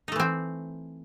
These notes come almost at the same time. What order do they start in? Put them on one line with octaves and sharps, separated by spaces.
D#4 A3 E3 C4